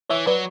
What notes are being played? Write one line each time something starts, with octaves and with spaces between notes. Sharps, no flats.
E3 C#5 E5
F#3 B4 D5